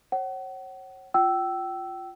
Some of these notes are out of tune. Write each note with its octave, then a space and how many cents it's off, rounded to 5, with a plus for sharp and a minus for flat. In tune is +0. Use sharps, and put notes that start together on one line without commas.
C#5 -35 F#5 +35
F4 +0 G5 -30 E6 +0